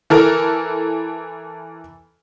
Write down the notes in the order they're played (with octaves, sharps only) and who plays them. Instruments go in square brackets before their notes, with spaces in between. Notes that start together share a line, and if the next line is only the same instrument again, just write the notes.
[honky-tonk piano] E3 A4 A#4